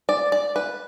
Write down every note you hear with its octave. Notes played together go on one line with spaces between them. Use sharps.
D5
D5
B4